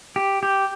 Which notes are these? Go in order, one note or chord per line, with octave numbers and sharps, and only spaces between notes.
G4
G4